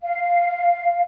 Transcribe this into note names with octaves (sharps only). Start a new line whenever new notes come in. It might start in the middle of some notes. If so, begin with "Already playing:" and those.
F5